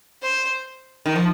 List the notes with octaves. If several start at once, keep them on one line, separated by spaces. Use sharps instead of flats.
C5
D#3
F3